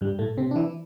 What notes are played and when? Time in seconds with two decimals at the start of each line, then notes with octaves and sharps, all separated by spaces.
0.01 G2 G3
0.19 A2 A3
0.37 C3 C4
0.51 D4
0.56 E3 E4